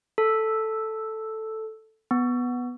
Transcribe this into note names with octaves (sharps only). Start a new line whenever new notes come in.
A4
B3